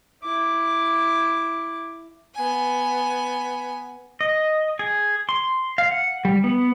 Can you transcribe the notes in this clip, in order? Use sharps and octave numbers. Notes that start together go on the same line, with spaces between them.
E4 D6
B3 G#5
D#5
G#4
C6
F5
F#5
G3
B3